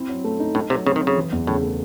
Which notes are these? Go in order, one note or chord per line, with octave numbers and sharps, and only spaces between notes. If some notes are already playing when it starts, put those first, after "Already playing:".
Already playing: C4 E4
F#3
A3
D#4
A2 D#4
C3 F#3
C#3 C4
D#3
F#3
C#3
E3
E2
A2 C#3
A3